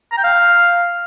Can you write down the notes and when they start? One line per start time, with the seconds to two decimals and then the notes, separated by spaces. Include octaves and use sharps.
0.12 A#5
0.18 G5
0.24 F5